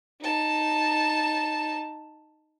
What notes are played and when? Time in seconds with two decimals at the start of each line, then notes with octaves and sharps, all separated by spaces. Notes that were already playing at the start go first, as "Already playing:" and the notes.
0.21 D#4 A5